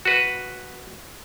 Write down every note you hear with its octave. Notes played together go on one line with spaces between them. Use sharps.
F#4 B4